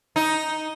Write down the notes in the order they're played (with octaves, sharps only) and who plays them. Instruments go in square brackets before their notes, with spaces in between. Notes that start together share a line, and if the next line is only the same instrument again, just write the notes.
[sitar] D#4